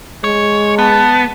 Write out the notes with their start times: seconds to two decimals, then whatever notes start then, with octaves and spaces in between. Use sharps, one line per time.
0.24 G#3 C#5
0.79 B3 A5